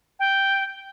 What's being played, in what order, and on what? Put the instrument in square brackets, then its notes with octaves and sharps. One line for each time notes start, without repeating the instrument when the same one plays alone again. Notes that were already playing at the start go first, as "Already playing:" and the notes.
[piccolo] G5